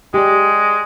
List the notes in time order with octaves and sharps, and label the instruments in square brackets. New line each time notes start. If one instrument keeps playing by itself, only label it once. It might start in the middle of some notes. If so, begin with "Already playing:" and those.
[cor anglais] G#3 [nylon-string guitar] G4 D5